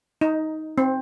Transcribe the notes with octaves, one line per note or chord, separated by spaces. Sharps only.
D#4
C4